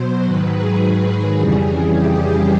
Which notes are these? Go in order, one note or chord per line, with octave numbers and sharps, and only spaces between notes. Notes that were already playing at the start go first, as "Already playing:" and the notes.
Already playing: B2 F#3 C5
G#2 D#3 F#3 B4
G#4
F2 C#3 E3 G3
G4
G#4